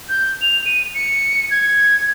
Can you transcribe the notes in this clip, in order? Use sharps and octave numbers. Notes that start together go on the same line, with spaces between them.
G6
F7
D#7
C#7
G#6